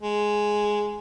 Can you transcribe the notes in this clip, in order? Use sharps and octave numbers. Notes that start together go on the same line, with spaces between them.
G#3